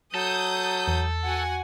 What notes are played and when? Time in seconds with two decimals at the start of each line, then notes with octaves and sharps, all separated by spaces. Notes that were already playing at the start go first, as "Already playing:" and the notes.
0.14 F#3 A4 D#6 G6
0.88 E2
1.25 F#4 F#5 G#5